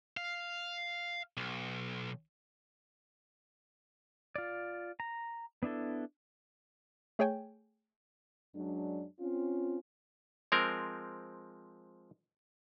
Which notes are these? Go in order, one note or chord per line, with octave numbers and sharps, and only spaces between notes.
F5
B1
F4 D5
A#5
B3 D4 E4 A4
A3 G#4 C#5 G5 G#5
F#2 F#3 G#3 D4
C4 C#4 F4
F3 G#3 C4 A#4